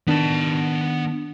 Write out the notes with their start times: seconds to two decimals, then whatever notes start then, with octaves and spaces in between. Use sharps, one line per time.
0.07 D#3 B3 D4 A5